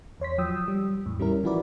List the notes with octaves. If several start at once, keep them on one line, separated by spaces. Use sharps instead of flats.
E2 C#5 C6 B6
F3 F#3 G5 D#6 E6
G3
E2 A2
G3 C#4 E4 A#4
E3 F3 E4 F#4 B4 D5